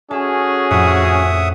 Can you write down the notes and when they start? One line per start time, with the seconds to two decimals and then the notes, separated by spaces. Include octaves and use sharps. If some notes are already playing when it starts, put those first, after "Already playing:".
0.11 C#4 F#4 G#4 A4 E5
0.71 F2 A2 E5 F#5 D#6